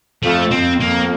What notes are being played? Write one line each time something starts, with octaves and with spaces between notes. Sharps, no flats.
F2 A3
F2 C4
A#3